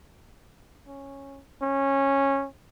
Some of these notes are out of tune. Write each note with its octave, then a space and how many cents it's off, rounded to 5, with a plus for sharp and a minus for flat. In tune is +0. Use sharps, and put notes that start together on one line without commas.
C#4 -10
C#4 -15